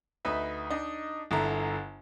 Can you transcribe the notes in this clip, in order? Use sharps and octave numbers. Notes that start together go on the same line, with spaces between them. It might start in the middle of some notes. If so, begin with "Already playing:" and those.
D2 D#4 B4 E5
D4 D#4 D#5
G1 D3 E4 A#5